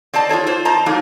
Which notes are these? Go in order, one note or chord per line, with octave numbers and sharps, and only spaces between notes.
C4 D5 D#5 A5
F4 G#4 A4 C#5
F4 C5
C4 D#5 A5 A#5
F#3 A3 A#3 D#4